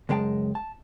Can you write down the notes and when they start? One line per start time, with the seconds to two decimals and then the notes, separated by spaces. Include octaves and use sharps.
0.09 C#2 F#2 G#3 G5 A5
0.55 A5